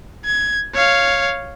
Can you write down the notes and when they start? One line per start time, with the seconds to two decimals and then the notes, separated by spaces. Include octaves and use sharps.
0.25 G#6
0.74 C#5 F5